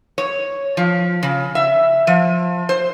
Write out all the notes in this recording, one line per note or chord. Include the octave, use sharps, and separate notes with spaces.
C#5
F3
C#3
E5
F3
C5